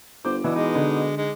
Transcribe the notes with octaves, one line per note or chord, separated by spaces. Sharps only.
G1 C5 D6
B2 E3 D4 E5
G#3 D#4
D3
G#3 D#4